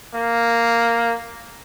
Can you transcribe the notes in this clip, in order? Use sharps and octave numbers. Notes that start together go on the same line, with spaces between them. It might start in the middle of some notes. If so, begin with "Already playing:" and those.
A#3